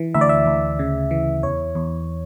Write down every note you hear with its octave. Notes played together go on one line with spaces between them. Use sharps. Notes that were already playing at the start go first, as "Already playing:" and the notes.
Already playing: E3
D2 E5
D5
E5
D2
C#3
E3
E2 C#5
E2